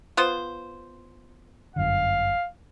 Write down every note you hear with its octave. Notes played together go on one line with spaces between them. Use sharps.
B3 F4 C5
G1 F#2 D3 F5